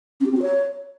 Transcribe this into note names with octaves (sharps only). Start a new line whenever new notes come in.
C#4
G4
C4
F#4
C#5